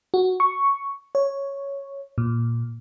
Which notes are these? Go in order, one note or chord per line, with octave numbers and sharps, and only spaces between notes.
F#4
C#6
C#5
A#2